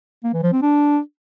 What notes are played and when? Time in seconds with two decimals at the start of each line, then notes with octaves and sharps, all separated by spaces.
0.24 A#3
0.33 E3
0.43 F3
0.53 C4
0.62 D4